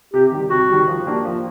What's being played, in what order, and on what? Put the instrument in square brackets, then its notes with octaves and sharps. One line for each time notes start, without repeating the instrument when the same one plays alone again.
[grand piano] C3 [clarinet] G4
[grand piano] D#3 G3
[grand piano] C3 [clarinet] F#4
[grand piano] D#3 G3
F3
A#3 D4 G4
F3